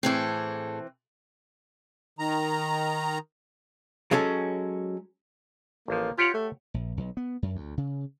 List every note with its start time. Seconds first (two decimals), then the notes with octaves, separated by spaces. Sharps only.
0.03 A2 E3 C4 G#4 A4
2.19 D#3 A#5
4.11 F#3 G#3 C#4 A4
5.88 A1 F3 A#3
6.18 F4 G4 C#5 F#5
6.34 A3
6.74 A#1
6.97 B1
7.17 B3
7.43 F#2
7.56 D2
7.78 C#3